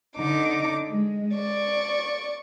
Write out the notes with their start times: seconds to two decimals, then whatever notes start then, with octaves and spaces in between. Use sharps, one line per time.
0.17 D3 D#4 D6
0.87 G#3
1.34 D5 C#6